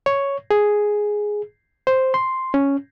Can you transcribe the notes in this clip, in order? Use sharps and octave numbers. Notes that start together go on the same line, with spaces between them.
C#5
G#4
C5
C6
C#4